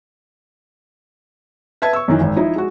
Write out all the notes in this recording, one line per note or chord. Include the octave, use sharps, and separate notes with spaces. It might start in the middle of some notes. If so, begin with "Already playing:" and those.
B4 E5 A5 G#6
C#6 E6
F#2 D#3 E3
G#1
F3 D#4 E4
G#3 F#4